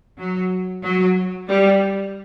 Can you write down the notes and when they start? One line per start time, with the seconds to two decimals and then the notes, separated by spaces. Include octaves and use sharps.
0.18 F#3
0.83 F#3
1.49 G3